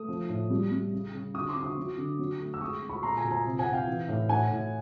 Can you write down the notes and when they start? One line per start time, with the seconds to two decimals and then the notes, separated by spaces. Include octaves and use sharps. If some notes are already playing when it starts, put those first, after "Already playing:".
Already playing: A3 D#6
0.09 F3
0.29 A2
0.50 G3
0.72 G3
0.93 C#3
1.14 C#3
1.34 D3 C#6 D#6
1.49 C6 D6
1.56 D3
1.63 C#6 D#6
1.77 F#3
1.98 D3
2.19 F#3
2.40 A3
2.54 E6
2.61 G#3 C#6 D#6
2.83 G#3
2.89 B5 C#6
3.03 A#2 A#5 C6
3.17 G#5 A#5
3.24 A#2
3.31 G#5 A#5
3.45 C3
3.59 F#5 G#5
3.67 C3
3.73 F5 G5
3.87 E3
4.09 A2
4.29 A2 F#5 G#5
4.51 A2